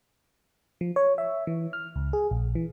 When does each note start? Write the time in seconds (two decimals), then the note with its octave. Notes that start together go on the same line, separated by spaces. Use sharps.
0.81 F3
0.96 C#5
1.18 E5
1.47 E3
1.73 F6
1.96 C#2
2.13 G#4
2.31 A#1
2.55 E3